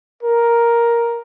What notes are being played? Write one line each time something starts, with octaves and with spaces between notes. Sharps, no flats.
A#4